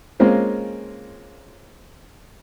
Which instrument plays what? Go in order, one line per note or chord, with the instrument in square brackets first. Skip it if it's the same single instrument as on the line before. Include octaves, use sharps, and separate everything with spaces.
[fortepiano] G#3 A#3 C4 C#4 F4